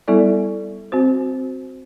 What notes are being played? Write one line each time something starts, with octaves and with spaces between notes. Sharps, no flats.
G3 B3 E4 A4 D5
C4 F#4 C5